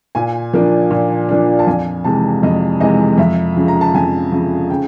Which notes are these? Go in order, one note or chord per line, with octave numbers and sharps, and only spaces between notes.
A#2 G#5
F3 A#3 D4
A#2
F3 A#3 D4
A5
F2 G#5
C3 E3 G#3 A5
F2 D#5
C3 E3 G#3 D#5
F2 E5
C#3 F3
A#5
A5
F2 G#5
C#3 F3
C#3 G5